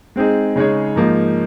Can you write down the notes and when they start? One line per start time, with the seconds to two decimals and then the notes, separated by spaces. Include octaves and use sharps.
0.16 G#3 C4 D#4 G#4
0.56 C#3 G#3 D#4 G#4 C#5
0.96 G#2 F3 A#3 D#4